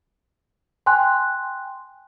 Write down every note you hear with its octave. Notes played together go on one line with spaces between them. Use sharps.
G5 G#5 C6 F#6